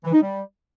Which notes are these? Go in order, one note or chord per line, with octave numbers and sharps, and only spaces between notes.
E3
D#4
G3